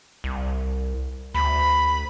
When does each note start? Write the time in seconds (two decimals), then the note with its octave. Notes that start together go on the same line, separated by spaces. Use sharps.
0.24 C2
1.34 D2 B5